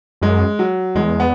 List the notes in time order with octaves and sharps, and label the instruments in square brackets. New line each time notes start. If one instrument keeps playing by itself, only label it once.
[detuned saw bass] F#2 [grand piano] G#3
[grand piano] F#3
[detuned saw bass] E2 [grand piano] G#3
[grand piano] B3